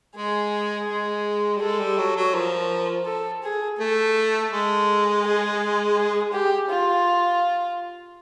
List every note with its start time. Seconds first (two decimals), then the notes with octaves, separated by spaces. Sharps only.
0.16 G#3 G#4
0.88 G#3
1.56 G3
1.61 G#3 A4
1.79 G3
1.98 F#3
2.16 F#3
2.34 F3 A#4
3.06 A4
3.43 G#4
3.79 A3 A4
4.52 G#3
5.24 G#4
5.97 G#4
6.33 G4
6.70 F4